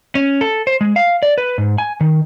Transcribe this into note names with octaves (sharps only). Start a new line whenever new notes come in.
C#4
A4
C5
G#3
F5
D5
B4
G#2
G#5
D#3